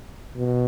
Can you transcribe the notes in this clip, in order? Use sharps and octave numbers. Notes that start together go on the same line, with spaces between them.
B2